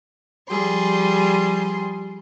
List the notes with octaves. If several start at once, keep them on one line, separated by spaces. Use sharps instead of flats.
F3 G3 G#4 C6